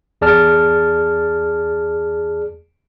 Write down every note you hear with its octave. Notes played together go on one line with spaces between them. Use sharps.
E2 G#4 D5 A5 F6